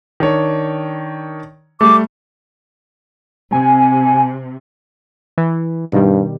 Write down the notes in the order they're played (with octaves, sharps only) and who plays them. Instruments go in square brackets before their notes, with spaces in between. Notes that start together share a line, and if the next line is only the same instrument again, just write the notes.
[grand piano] D#3 D4 C#5
[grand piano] G3 A3 [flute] D6
[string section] C3 [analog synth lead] G#5
[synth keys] E3
[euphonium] G2 [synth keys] B2 D#3 G3